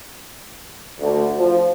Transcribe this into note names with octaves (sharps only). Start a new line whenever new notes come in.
D2
F3